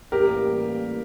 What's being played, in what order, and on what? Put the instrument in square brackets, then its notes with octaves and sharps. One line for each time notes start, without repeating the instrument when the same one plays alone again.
[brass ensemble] A1 A2 E3 G3 A#3 [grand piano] G4 A#4